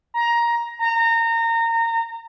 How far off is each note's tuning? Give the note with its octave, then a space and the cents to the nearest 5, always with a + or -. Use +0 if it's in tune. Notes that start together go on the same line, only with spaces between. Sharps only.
A#5 +15
A#5 -25